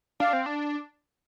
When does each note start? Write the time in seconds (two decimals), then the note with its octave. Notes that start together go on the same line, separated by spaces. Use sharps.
0.20 D4 F5
0.33 C4
0.46 D4